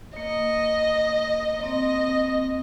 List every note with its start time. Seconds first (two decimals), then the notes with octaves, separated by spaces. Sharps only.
0.16 A#3 D#5
1.53 A#3
1.63 C4 D#5